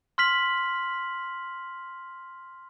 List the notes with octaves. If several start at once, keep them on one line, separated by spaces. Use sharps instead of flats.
C6 F6 B6 F#7